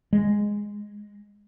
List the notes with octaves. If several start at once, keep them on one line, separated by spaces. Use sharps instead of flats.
G#3